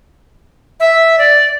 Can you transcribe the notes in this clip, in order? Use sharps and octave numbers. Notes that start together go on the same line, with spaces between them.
E5
D5